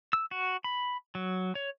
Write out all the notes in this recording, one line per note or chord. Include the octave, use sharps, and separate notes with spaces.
E6
F#4
B5
F#3
C#5